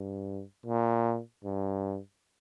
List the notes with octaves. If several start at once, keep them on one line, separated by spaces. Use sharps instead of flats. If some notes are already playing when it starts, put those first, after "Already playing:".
Already playing: G2
A#2
G2